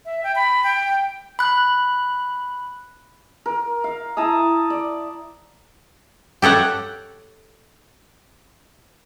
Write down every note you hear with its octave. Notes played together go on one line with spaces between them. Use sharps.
E5
G5
B5
G5
B5 F#6
A#4
F5
E4 A5 A#5 D#6
D5
G4 A4 C#5 F#5